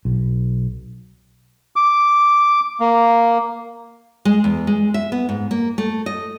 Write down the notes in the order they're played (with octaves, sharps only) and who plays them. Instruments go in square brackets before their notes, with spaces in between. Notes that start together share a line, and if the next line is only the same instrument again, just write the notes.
[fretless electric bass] B1
[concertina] D6
A#3
[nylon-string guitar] G#3
E2
G#3
E5
B3
G#2
A#3
A3
D#5